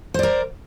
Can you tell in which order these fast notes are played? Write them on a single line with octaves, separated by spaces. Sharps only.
C5 D5 A#4